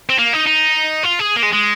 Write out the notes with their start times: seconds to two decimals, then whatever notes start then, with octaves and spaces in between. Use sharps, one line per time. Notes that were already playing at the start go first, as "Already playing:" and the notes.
0.10 C4
0.19 A#3
0.33 D#4
0.47 D#4
1.04 F4
1.19 G#4
1.36 A#3
1.42 G#3
1.53 G#3